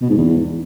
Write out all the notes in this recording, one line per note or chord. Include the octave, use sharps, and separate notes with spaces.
B2
G#2
E2